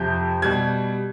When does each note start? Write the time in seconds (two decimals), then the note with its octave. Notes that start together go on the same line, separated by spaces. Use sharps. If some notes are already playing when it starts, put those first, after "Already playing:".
Already playing: F2 C3 F3 G6
0.42 B2 G3 G#6